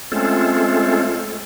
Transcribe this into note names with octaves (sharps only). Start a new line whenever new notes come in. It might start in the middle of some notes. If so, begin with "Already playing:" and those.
G#3 A3 C4 C#4 F4 A4